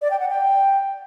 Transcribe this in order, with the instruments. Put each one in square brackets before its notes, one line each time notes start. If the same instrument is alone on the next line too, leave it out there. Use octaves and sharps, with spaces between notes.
[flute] D5
G5
F#5
G5